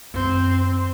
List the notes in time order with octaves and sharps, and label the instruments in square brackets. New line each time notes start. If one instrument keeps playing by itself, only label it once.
[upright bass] F#2 D#3 [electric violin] C4 C5